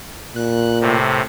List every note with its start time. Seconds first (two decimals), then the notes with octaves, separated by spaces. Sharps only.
0.36 A#2 F#6
0.81 A2 C3